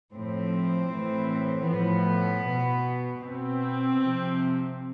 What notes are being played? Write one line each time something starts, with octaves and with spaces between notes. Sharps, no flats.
A2 F3 C4
A2 E3
A2 F3 B3
B2
B2 C4
C3 F3